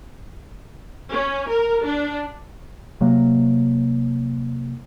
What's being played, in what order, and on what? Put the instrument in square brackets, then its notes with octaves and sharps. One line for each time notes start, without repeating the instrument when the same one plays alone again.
[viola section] C#4
A#4
D4
[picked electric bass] C3 F#3 A#3